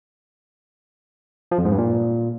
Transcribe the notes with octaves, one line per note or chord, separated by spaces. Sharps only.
F3
F2
G#2
G2
A#2